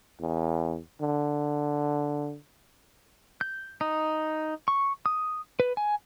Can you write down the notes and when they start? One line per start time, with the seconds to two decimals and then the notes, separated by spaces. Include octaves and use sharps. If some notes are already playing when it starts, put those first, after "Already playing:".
0.20 E2
1.01 D3
3.41 G6
3.81 D#4
4.68 C#6
5.06 D#6
5.60 B4
5.77 G#5